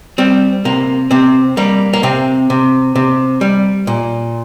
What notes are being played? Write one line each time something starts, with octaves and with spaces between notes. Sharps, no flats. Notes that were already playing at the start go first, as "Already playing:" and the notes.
G3 C4
C3 A#3
C3 C4
G3 A#3
A#3
C3 C4
C3
C3
G3
A#2